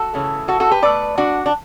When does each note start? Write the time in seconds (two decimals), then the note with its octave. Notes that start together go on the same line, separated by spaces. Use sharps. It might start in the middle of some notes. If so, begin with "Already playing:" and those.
Already playing: F#4 A4
0.14 C#3 E3 A3
0.48 F#4 A4
0.60 F#4 A4
0.71 G4 B4
0.82 B2 A3 B4 D5
1.18 D4 F#4
1.46 D4